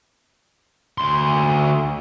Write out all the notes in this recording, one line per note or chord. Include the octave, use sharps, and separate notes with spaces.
D2 C6